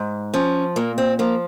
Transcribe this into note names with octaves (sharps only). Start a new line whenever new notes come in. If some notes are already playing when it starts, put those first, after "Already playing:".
Already playing: G#2
F3 C#4
A#2 A#3
C4
F3 A#3